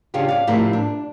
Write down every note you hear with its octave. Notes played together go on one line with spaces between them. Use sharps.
C#3 C#4 D4 F4 G4
D5 F5
A2 C3 F3 E4 A#4
D4